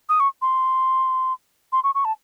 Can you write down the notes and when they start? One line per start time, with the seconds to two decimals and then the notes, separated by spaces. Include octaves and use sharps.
0.09 D#6
0.20 C#6
0.42 C6
1.72 C6
1.84 C#6
1.95 C#6
2.05 A5